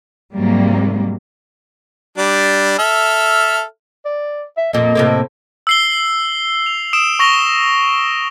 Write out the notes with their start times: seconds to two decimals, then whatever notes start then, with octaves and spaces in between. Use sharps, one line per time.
0.35 G#2 C3 F#3 G3 A#3
2.18 G3 D4
2.79 A4 E5 F6
4.05 D5
4.57 E5
4.73 F2 A#2 D#5
4.95 A2 C3 A#3
5.67 E6 C7 G7
6.66 F7
6.93 D#6 D7 E7
7.19 C#6 A#6 F7 G7